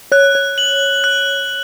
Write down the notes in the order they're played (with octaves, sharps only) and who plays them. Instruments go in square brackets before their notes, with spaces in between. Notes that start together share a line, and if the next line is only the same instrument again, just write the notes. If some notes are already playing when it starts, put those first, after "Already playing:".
[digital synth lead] C#5 [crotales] F#6
[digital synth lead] C#5
[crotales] F#7
F#6